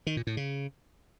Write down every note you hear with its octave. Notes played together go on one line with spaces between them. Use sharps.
D#3
A#2
A2
C#3